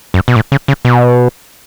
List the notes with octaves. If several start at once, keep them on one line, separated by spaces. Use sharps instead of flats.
F#2
B2
A2
C#3
C#3
B2